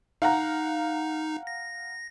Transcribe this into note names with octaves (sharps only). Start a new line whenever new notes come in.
D#4 F5 F#5 A#5
A#6